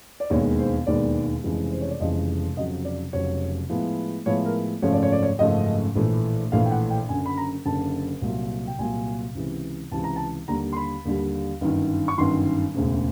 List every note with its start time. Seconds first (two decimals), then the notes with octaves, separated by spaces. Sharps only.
0.20 D5
0.30 E1 D#2 D#3 G#3 B3 C#5
0.58 C5
0.87 E1 D#2 D#3 G#3 B3 D5
1.43 F1 F2 C#3 E3 G#3
1.72 C5
1.81 C#5
1.90 D5
2.00 F1 F2 C#3 E3 G#3 D#5
2.56 F1 F2 C#3 F#3 D#5
2.85 D5
3.13 F1 F2 C#3 F#3 C#5
3.70 A2 F3 G#3 B3 E4
4.26 A2 F3 G#3 B3 E4 C#5
4.45 A#4
4.82 G#1 F#2 C#3 F3 A3 C#5
4.93 D5
5.03 C#5
5.12 D5
5.23 C#5
5.39 G#1 F#2 C#3 F3 A3 D#5
5.95 A#1 A2 E3 A3
6.52 A#1 A2 E3 A3 F5
6.65 G5
6.71 F#5
6.90 G5
7.09 F#1 F#2 D3 G#5
7.26 B5
7.37 A#5
7.65 F#1 F#2 D3 A5
8.22 C2 A#2 F#3
8.67 G5
8.78 C2 A#2 F#3 G#5
9.35 C#2 C3 E3
9.92 C#2 C3 E3 A5
10.04 A#5
10.16 A5
10.48 D#2 D3 G3 A#5
10.72 C6
10.76 B5
11.05 D#2 D3 G3
11.61 G1 F#2 D#3
12.08 C#6
12.18 G1 F#2 D#3 C6
12.74 E1 D2 C#3